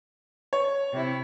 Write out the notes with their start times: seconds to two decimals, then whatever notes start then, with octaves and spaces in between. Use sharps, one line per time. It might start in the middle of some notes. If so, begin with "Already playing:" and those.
0.53 C#5
0.92 C3 E4